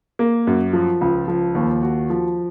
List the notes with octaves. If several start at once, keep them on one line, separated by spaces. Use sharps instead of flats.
A#3
F#2
F3
C#2
F3
D#2
F#4
F3